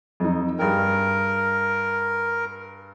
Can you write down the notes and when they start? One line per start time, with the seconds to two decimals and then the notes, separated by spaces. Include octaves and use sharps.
0.20 F2 D#4
0.58 G2 G#4 A#4 G5